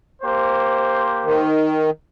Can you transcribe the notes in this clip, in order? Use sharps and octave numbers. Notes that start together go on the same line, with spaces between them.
A#3 G4 C5
D#3